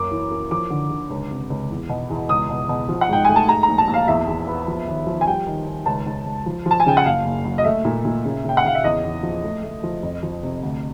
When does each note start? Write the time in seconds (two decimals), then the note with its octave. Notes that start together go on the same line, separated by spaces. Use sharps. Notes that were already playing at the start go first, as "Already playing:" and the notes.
Already playing: F#2 A#3 D6
0.11 E3
0.31 A#3
0.51 F3 D6
0.70 D3
0.90 D3
1.10 C#2
1.31 C3
1.50 C#2
1.70 E2
1.89 B2
2.10 E2
2.29 C#2 D#6
2.49 B2
2.69 B2
2.89 F3
3.01 F#5
3.09 G#2 G5
3.25 A3 G#5
3.36 A5
3.48 G#2 A#5
3.63 A#5
3.68 A#1
3.78 A5
3.88 A#1
3.94 F5
4.08 E2 E5
4.27 E2
4.48 B3
4.68 F3
4.87 D#2
5.07 F3
5.21 G#5
5.26 G3 G5
5.47 D#3
5.66 D#3
5.86 C#2 A5
6.06 C#2
6.25 C#2
6.46 F3
6.66 F3
6.71 A5
6.80 G#5
6.86 C#3 G5
6.97 F#5
7.06 F#1 F5
7.25 F#1
7.45 F#3
7.58 D#5
7.64 A3 E5
7.85 A#2
8.05 A#2
8.25 C#3
8.45 C#3 G5
8.57 F#5
8.64 C#3 F5
8.75 E5
8.84 E2 D#5
9.04 E2
9.23 F3
9.44 A3
9.63 A3
9.83 F3
10.03 F2
10.23 F3
10.43 C3
10.63 D2